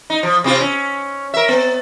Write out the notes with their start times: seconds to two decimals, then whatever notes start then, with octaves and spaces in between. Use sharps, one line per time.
0.10 D#4
0.23 F3
0.44 C3 C4 F4
0.61 C#4
1.34 A#4 E5
1.48 B3